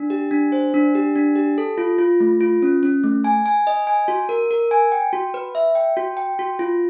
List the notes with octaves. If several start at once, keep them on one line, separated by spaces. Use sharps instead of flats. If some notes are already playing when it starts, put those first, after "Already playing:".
Already playing: D4
G4
D4
C5
D4
G4
D4
G4
A4
F4
F4
A3
F4
C#4
C#4
A3
G#5
G#5
D#5
G#5
F#4
A#4
A#4
G#5
G5
F#4
B4
E5
G5
F#4
G5
F#4
F4